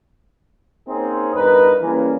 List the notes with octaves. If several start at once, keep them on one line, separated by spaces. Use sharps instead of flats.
A#3 C4 C#4 D#4 G#4 C5
E2 G2 D#4 A#4 B4
C#3 E3 G3 A#3 C#4